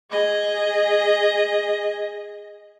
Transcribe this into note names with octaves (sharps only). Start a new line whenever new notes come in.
G#4 D#5